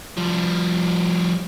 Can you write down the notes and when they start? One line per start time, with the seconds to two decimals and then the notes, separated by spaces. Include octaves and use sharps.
0.17 F3 G3